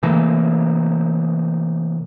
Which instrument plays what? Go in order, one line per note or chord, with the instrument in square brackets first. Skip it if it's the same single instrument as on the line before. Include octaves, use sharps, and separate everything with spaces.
[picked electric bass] C3 E3 A3 A#3